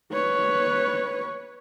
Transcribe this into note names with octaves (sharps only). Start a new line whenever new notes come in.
B4 C#5